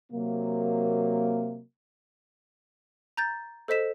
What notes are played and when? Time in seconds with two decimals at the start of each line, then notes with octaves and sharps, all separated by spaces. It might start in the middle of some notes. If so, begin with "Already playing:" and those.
0.11 C3 F#3 A#3
3.17 A#5 G6 A6
3.68 A4 C5 D#5 B6 E7